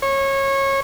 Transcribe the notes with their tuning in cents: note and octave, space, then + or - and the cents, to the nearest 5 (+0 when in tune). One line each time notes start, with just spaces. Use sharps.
C#5 -25